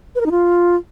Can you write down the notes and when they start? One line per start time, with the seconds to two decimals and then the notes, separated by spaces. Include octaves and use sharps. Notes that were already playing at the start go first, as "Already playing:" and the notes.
0.15 B4
0.21 A#4
0.26 D#4
0.31 F4